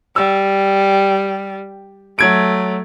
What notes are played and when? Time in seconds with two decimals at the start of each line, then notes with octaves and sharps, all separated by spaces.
0.16 G3 E6
2.19 F#3 A3 G#6 D7